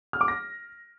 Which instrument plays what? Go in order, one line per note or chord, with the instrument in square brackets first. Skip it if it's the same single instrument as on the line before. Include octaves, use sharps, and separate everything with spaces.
[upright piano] F6
D6
A#6